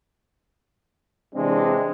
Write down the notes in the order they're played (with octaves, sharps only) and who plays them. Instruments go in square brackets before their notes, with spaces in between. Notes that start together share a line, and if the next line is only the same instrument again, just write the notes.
[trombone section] C3 E3 G#3 C4 D4